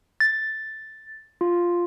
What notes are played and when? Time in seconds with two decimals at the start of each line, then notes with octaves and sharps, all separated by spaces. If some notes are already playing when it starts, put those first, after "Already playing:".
0.20 A6
1.41 F4